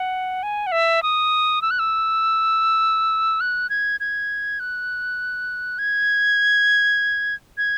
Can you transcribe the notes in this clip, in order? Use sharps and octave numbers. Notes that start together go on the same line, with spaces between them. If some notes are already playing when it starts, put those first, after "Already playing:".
Already playing: F#5
G#5
F#5
E5
D#6
E6
F#6
E6
F#6
G#6
G#6
F#6
G#6
G#6